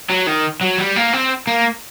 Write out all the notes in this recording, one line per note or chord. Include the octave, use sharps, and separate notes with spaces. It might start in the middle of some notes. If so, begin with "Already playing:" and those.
F#3
D#3
F#3
G3
A#3
C4
A#3